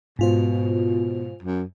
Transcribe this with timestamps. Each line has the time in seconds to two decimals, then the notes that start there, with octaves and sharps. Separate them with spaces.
0.19 G#2 B2 F4 C5
1.43 F#2